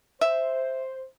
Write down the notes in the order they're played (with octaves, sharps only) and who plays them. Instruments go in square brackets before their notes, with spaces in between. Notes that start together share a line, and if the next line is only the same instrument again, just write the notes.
[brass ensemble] C5 [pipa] E5